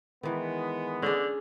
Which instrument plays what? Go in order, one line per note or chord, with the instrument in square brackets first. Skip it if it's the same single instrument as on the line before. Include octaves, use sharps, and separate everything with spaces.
[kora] D#3 E3 [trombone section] G#3 B3
[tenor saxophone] D3 [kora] C#4 D4 G#4